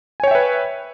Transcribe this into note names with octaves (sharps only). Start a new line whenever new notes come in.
B4 C#5 E5 G5 G#5